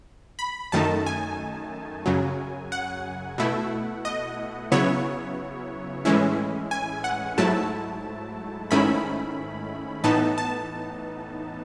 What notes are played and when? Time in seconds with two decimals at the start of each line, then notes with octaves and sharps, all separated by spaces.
0.39 B5
0.72 F#2 D#3 A3 D#4 A5
1.06 G#5
2.06 F#2 C#3 F#3
2.72 F#5
3.38 B2 A3 E4
4.05 D#5
4.72 C#3 F#3 B3 E4 C#5
6.05 A2 E3 G#3 C#4 E4
6.71 G#5
7.04 F#5
7.38 G#2 F#3 A3 E4 A5
8.71 G#2 D#3 A3 C#4 E4 B5
10.04 A2 E3 B3 D#4 A5
10.38 A5